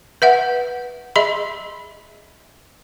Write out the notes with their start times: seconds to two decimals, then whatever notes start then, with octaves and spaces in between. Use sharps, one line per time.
0.22 B4 E5 F#5
1.16 G#4 D#5 E5 B5 C6